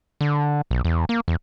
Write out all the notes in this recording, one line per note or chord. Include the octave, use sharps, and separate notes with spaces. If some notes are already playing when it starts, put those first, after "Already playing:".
D3
B1
E2
A#3
E2